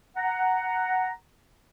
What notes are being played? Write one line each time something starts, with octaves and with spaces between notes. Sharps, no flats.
F#5 A#5